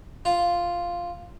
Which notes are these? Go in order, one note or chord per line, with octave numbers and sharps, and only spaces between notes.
F4